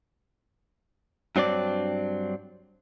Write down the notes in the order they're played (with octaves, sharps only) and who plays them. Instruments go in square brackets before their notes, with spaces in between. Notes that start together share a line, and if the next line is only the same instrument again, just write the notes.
[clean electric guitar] G2 F#3 C4 D4 D5